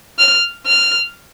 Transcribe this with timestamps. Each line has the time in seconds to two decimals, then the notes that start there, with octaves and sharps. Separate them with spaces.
0.19 F6
0.67 F6